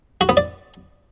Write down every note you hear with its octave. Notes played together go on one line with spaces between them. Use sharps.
F#4
B3
D5